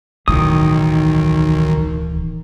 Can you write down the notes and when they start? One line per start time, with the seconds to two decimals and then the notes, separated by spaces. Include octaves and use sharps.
0.28 D1 B1 D#3 E3 D#6